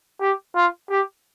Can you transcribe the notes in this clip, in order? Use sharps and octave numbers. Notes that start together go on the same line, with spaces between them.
G4
F4
G4